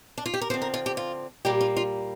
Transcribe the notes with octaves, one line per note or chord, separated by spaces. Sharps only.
D4
F4
G4
A#4
D3 F3 C4 C5
A#4
F4
G4
F4
A#2 G3 A#3 G4
F4
F4